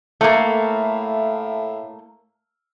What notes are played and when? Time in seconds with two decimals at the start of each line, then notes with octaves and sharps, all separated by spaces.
0.21 A2 A3 A#3 E5 F5